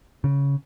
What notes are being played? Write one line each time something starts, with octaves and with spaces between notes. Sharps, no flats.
C#3